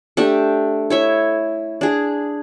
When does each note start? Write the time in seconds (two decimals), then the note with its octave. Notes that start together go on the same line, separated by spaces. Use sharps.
0.17 A3 D4 G4 A4
0.90 E4 C#5 E5
1.81 D4 G#4